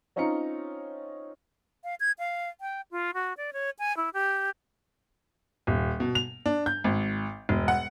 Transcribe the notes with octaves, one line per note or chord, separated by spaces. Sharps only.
C4 C#4 D#4 F4 A#5 C#7
F5
G#6
F5
G5
F4
F#4
D5
C#5
G#5
E4
G4
D#1
B2
F7
D4
G6
G#1
E1
F#5